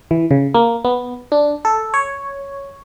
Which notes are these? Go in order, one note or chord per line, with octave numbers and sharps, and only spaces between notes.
E3
C#3
A#3
B3
D4
A4
C#5